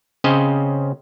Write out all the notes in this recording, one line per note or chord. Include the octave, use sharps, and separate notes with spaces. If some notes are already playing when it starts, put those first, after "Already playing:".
C#3 C4 C#4 C5 D#5